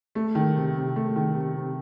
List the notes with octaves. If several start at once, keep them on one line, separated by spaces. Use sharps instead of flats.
A3
D#3
C3
C3
A3
D#3
C3
C3